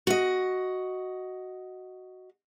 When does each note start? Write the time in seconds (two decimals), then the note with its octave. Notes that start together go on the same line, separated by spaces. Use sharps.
0.07 F#4 D#5